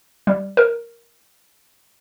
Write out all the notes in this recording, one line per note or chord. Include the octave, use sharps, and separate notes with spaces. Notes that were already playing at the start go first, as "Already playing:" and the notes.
G3
A#4